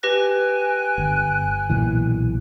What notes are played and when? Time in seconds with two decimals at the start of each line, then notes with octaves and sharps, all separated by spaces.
0.03 G4 B4 G5 G#5 F#6 A#6
0.98 G1
1.70 B1 A#2 E3